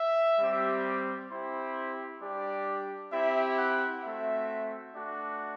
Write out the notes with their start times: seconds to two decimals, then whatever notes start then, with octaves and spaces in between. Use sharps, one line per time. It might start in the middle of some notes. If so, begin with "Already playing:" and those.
Already playing: E5
0.39 G3 C4 G4
1.30 C4 E4 G4 C5
2.21 G3 D4 G4 D5
3.13 C4 E4 G4 E5
3.58 F#5
4.04 A3 C4 F#4 E5
4.95 A3 D4 F#4 D5